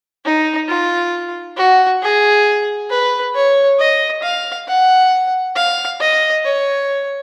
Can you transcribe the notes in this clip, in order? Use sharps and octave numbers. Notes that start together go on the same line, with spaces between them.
D#4
F4
F#4
G#4
B4
C#5
D#5
F5
F#5
F5
D#5
C#5